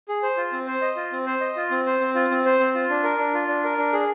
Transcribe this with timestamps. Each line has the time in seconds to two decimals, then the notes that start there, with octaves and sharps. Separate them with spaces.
0.08 G#4
0.23 C5
0.37 F4
0.53 C4
0.67 C5
0.82 D#5
0.96 F4
1.12 C4
1.26 C5
1.41 D#5
1.56 F4
1.71 C4
1.86 C5
2.01 C4
2.15 F4
2.31 C4
2.45 C5
2.60 C4
2.75 F4
2.89 D4
3.04 A#4
3.18 D4
3.34 F4
3.48 D4
3.64 A#4
3.78 D4
3.93 G#4